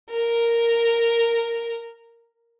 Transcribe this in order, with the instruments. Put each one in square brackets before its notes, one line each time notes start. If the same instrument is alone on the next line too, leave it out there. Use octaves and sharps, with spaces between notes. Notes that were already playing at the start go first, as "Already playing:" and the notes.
[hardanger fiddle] A#4